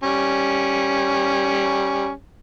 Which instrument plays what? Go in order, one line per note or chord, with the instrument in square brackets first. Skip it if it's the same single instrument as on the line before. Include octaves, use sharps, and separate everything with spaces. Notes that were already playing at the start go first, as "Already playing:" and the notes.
[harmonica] G3 C#4